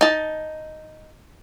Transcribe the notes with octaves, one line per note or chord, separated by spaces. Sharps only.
D#4 A5